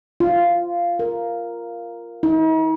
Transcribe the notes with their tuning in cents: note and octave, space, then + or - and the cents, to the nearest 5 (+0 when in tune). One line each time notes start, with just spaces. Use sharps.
F4 -10
A#4 +0
D#4 +45